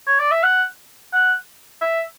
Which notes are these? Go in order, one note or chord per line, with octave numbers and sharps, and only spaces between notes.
C#5
D5
E5
F#5
F#5
E5